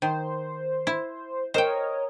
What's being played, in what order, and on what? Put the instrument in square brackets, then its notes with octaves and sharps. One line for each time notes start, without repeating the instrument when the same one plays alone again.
[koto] D#3 [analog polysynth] C5
[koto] E4
[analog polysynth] A#4 C#5 D#5 [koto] C5 G5